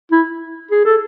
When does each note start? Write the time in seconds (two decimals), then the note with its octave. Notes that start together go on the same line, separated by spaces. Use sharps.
0.12 E4
0.71 G#4
0.85 A4